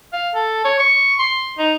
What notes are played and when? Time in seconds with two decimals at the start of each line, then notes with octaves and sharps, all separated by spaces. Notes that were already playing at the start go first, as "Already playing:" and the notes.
0.13 F5
0.35 A4
0.65 C#5
0.79 C#6
1.19 C6
1.59 D#4